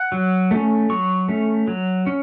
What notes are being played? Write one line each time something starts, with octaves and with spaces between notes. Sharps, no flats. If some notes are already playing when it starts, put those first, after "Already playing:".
Already playing: F#5
F#3
A3 C#4
F#3 C#6
A3 C#4
F#3
C#4